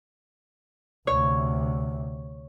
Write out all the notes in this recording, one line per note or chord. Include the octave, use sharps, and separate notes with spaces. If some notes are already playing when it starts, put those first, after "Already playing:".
D2 C3 C#5